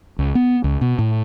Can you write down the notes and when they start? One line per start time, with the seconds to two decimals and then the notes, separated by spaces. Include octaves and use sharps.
0.19 C#2
0.35 B3
0.64 C#2
0.81 B2
0.99 A2